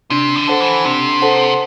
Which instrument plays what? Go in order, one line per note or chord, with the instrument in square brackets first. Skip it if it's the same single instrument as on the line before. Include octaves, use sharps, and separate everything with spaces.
[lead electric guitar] C3 [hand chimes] D4
[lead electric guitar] D3
[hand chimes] A4 C5 F#5 A5
[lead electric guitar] E3
[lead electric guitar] C3 [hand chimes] D4
[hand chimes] A4 C5 F#5 A5